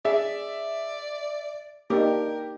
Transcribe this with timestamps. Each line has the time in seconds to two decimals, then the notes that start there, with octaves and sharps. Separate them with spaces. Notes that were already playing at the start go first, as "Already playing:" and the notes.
0.05 G#4 D5 E5
1.90 A#3 D4 D#4 G4 A#4